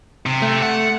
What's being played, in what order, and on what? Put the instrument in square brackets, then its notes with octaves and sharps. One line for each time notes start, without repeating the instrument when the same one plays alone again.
[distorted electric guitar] C3
[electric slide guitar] A3
[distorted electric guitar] F#5